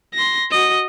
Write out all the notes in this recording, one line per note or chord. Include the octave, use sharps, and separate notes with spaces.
C6 A#6
F#4 D#5